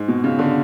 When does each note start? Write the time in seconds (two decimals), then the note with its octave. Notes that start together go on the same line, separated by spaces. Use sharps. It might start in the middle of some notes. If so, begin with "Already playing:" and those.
Already playing: G#2
0.08 B2
0.24 C#3
0.39 D3